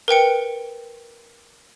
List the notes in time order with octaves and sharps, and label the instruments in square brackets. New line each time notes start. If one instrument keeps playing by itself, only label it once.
[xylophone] A#4 B4 G5 C#7